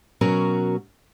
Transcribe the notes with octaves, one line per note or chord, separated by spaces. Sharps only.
B2 F#3 C#4 F#4 A#4